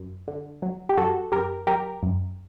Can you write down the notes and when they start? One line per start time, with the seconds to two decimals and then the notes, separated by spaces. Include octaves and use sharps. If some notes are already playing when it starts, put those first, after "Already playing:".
Already playing: F#2
0.28 D3
0.62 F#3
0.89 G4
0.97 F#2 F#4 A4
1.32 F#2 G4 A#4
1.67 F#3 G4 A#4
2.03 F#2